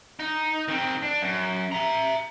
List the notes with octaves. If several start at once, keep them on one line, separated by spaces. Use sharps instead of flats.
D#4
D#3 C4
D4
F#2
E5 A#5